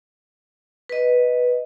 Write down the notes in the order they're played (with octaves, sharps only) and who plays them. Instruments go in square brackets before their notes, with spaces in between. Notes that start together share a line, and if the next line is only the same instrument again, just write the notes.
[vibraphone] B4 D#5